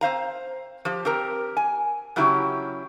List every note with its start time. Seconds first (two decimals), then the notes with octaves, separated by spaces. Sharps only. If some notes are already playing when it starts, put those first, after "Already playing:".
0.01 C4 C5 F5 A#5
0.85 F3 G4
1.05 C4 G4 A#4 A#5
1.57 G#5
2.16 C#3 F#3 C#4 E4 G4